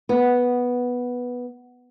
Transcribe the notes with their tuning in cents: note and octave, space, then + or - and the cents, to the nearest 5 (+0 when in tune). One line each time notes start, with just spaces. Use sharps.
B3 -5